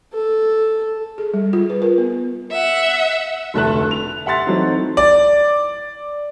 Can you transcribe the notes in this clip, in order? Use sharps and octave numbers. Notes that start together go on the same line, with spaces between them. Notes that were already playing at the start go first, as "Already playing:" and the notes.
A4
G#4
G3
F4
B4
A#4
B3
E5 F#5
F1 D2 A3 E4 A5 F#6
F7
E5 F#5 C6 A6
E3 F#3 A3 C4 D#4
D5